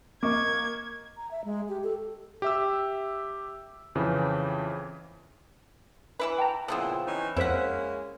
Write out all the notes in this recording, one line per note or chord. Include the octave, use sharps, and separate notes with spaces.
A#3 D#5 C#6 D6 G#6
A#5
E5
G#3
G4
A4
G4 E5 E6
F2 C#3 E3
E3 E4 B4
G5 A5 A#5
A#2 C#3 F3 B3 C4 E4
E3 C#4 D#4
F2 G#3 A#3 C#4 E4 C5 F#5 B6